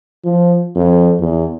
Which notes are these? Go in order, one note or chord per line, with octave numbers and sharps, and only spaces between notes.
F3
F2
E2